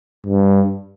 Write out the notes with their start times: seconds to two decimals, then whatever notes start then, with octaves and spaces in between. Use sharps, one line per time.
0.26 G2